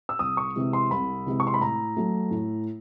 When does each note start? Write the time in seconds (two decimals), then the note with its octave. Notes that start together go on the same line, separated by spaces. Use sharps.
0.09 E6
0.19 C2 D#6
0.37 C#6
0.56 C3 E3 G#3
0.73 C6
0.91 C2 B5
1.26 C3 E3 G#3
1.40 C#6
1.47 C6
1.54 B5
1.60 A2 A#5
1.97 F#3 A3
2.31 A2